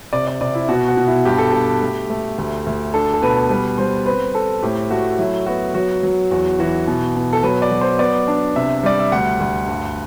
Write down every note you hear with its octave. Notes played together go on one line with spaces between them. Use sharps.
C3 D5
D5
C3 D5
E4
B2 F#4
F#4
B2
E4
G2 G4
A4
G2 G4
A3
A3
D2
D2
D4 A4
A4
B2 B4
G3 B4
G3 C5
C4 B4
C4 A4
A2 G4
A3 F#4
F#3 E4
B3 F#4
F#3 F#4
F#3
E2 F#4
E3 F#4
B2
B2
A4
F#3 B4
D5
F#3
C5
B3 D5
D4
C3 E5
G3 D5
E5
D2 F#5
D2
G2